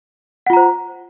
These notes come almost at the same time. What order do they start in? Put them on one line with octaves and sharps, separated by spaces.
F#5 F4 A#5 C5